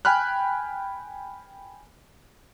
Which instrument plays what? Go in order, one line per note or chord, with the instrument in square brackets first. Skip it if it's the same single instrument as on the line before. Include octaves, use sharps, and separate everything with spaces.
[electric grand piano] G5 G#5 B5 F6 F#6